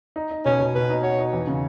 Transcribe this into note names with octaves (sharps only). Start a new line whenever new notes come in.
D#4
D#4
B2 C#4
B2
B2 B4
D#4
F#4 C#5
D#4
E2
C#3